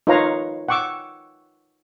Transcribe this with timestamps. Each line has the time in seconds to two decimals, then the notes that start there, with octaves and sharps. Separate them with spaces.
0.07 D#4 F4 B4 C#5 F5 A#5
0.69 F#5 G5 C#6 D6 E6